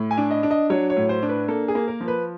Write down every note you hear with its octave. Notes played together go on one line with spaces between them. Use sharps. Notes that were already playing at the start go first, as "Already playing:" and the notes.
Already playing: A2
G#5
D4
D#5
D4
D#5
F#3 C#5
C#5
A2
C5
D4
B4
A#3 A4
G#4
A#3
A#4
F3
B4